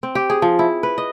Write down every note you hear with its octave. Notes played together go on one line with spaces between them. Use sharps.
C4
G4
G#4
F3
E4
B4
D#5